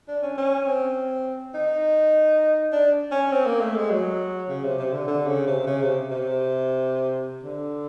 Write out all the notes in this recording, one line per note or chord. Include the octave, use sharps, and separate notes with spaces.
D4
C#4
C#4
C4
D#4
D4
C#4
C4
A#3
A3
G#3
F#3
C#3
C3
C3
D3
D3
C#3
C3
C#3
C3
C3
D3